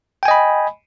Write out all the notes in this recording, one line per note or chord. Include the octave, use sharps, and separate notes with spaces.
D#5 G5 G#5 B5